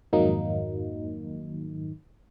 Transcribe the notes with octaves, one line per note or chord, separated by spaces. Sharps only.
F2 G#2 D#3 F#3 A#3 D#4